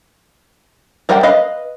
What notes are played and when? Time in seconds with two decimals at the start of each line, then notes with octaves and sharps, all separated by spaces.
1.09 G3 A#4 C5 F#5 G5
1.23 B4 D#5 F5